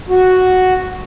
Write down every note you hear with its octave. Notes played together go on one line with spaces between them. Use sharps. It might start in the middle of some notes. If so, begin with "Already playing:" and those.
F#4